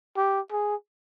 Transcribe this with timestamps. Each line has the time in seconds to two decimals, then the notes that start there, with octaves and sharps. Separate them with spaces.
0.17 G4
0.51 G#4